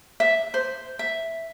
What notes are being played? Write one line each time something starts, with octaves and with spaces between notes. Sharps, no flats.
E5
C5
E5